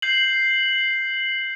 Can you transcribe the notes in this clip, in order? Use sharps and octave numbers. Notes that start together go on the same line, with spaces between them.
G6 C7 F#7